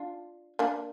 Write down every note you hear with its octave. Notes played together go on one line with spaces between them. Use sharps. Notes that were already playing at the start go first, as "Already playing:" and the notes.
Already playing: D4 F4
A#3 D4